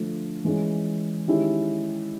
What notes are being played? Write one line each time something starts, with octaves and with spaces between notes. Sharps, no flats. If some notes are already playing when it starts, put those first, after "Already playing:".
Already playing: D3 F3 A3 D4 F4
E3 G#3 C#4 E4
D#3 G#3 C#4 E4 G4